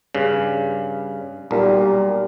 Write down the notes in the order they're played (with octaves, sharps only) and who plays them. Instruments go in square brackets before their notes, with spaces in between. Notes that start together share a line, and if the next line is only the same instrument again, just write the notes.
[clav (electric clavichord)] G2 C#3
[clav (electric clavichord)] B1 [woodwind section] A#2 [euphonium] G3